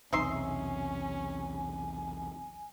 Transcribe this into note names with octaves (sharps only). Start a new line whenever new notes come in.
B1 E2 C3 C#4 D#4 E5 G#5 C6